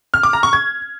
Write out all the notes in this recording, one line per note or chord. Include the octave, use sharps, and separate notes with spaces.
F6
D6
A#5
C#6
G#6